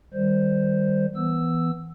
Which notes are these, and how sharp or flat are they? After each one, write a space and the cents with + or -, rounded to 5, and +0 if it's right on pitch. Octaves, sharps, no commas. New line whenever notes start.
D#3 +0 G3 +10 C5 +0
E3 -5 B3 +0 E6 +0